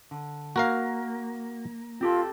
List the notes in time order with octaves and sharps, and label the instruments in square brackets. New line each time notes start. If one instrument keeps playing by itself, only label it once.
[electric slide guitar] D3
[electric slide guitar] A#3 [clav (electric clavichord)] F#4 A#4 F5
[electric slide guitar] C4 G4 A4 [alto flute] F4